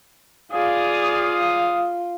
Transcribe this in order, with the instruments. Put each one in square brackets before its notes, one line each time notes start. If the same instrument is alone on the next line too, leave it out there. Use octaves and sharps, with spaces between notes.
[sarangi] F4 [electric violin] G#4 D5 [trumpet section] F5 D#6